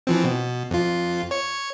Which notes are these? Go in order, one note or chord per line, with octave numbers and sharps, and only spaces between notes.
E3 F3 C4
B2
F2 F4
C#5 C#7